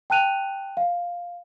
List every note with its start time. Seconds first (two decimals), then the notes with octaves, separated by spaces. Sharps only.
0.10 G5 A5 F#6 D#7 F7
0.77 F5